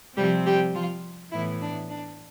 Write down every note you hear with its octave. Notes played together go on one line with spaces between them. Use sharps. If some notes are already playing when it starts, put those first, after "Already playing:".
C3 F3 G3 C4 G4
G3 G4
F3 F4
A2 E3 B3 E4
D4
D4